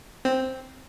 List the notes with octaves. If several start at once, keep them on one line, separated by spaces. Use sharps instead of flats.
C4